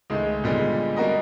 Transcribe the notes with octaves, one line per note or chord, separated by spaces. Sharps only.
C#2 D#3 G#3 A3
A#2 D3 G3 G#3 B3
G3 A#3 F#4 A#4 D#5